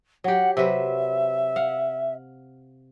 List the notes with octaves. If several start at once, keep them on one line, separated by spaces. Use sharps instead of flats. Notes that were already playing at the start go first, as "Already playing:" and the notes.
F#3 G4 F#5
C3 F#3 B4 E5
F5 F#5